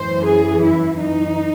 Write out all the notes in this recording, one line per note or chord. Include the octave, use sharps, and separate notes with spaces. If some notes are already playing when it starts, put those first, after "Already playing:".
Already playing: F#2 E3 C5
G#4
E4
D#4